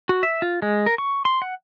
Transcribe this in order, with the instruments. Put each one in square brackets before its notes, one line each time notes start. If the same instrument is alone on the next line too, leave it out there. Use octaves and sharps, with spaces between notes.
[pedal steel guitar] F#4
E5
F4
G#3
A#4
C#6
C6
F#5